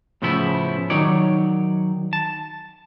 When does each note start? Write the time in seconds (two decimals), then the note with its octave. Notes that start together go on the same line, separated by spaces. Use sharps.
0.22 A2 C#3 F3 B3 E4
0.90 D#3 F#3 D#4 C#5 D5
2.13 A5